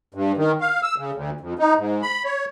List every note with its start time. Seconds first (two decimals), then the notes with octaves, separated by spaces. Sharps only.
0.14 G2
0.37 D#3
0.61 F5
0.83 E6
0.98 C#3
1.14 D2
1.40 F2
1.59 D#4
1.78 G#2
2.02 B5
2.25 C#5